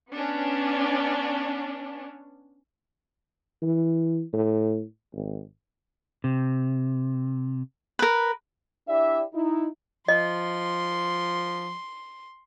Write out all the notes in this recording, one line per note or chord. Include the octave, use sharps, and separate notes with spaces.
B3 C#4 D4
E3
A2
G#1
C3
A#4 B4
D4 E4 G4 D5 E5
D#4 E4
F3 D#5 C6